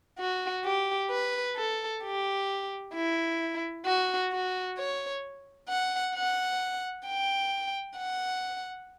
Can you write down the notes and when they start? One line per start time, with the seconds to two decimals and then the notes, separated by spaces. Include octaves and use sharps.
0.19 F#4
0.65 G4
1.10 B4
1.56 A4
2.03 G4
2.94 E4
3.86 F#4
4.32 F#4
4.78 C#5
5.68 F#5
6.15 F#5
7.07 G5
7.97 F#5